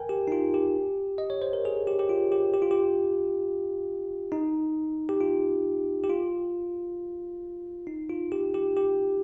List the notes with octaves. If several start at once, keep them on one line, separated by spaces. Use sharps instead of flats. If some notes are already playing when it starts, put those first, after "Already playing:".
Already playing: A#4 G5 G#5
G4
D#4
F4
G4
D#5
C#5
C5
A#4
G#4
G4
G4
F4
G4
G4
F4
G4
D#4
G4
F4
G4
F4
D#4
F4
G4
G4
G4